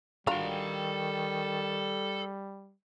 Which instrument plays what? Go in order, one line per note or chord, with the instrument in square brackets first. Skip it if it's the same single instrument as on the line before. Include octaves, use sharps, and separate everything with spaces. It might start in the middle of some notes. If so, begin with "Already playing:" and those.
[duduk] D#3 [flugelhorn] G3 [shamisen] D4 F4 F#4 [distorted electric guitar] A4 A#5